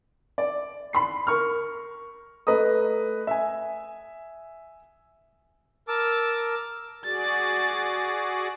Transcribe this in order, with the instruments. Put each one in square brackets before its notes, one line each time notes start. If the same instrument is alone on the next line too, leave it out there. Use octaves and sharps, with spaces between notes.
[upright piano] D5
B5 C6 C7
A#4 C#6 F6
A3 B4 D#5 A#5 D#6
E5 G#5
[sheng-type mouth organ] A#4 A5 D6 E6
[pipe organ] F#4 G#4 D5 [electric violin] A6